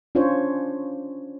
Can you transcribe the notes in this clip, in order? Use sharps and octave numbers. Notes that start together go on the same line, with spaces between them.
C#4 D4 F4 C5 C#5